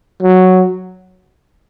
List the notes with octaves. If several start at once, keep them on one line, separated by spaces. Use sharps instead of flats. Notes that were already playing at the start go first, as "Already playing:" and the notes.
F#3